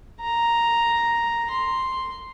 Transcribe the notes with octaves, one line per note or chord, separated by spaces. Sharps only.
A#5
C6